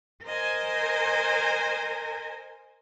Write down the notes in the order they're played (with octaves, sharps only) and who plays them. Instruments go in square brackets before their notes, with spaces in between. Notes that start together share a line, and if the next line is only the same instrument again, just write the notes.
[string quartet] A#4 C5 D#5 G#5